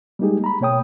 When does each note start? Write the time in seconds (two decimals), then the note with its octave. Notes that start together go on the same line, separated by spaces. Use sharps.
0.19 G3 G#3 A#3 D#4 G4 G#4
0.44 A#5 B5
0.61 B2 A#3 C#5 G5 D#6